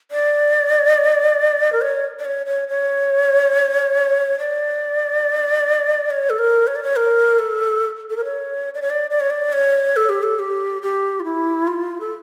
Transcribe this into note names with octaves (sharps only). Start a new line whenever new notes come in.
D5
A#4
C#5
D5
C#5
C#5
C#5
D5
C#5
A4
A#4
C#5
D5
C#5
A#4
A4
A4
A#4
C#5
D5
C#5
D5
D5
C#5
D5
C#5
A4
G4
A4
G4
G4
F4
E4
F4
A4